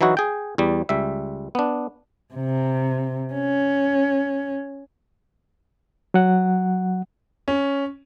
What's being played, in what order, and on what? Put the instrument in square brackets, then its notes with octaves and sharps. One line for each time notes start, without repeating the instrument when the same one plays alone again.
[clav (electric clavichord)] E3 F#3 D#4 E4 F#4
G#4 G5
E2 G3
C#2 G3 E5
B3 D4
[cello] C3
C#4
[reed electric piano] F#3 F#5
[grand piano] C#4